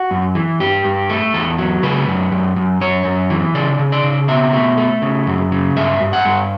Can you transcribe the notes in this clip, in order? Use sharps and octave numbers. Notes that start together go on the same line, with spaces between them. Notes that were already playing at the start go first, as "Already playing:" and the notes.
Already playing: F#4
F#2
E3
G2 G4
G2
A3
E2 A4
F#3
C#3 B4
F#2
F#2
F#2
F#2 C#5
F#2
E3
C#3 D5
C#3
D5
C#3
B2 E5
A3
A3
C#3
F#2
C#3
G2 E5
G2
F#5
G2